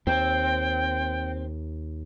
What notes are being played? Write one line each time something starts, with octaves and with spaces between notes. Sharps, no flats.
D#2 C4 G5